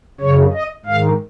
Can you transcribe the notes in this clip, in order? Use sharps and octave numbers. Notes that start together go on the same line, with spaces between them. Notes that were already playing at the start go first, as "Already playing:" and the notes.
F#2 C#3 C#5
D#5
G#2 D#3 F5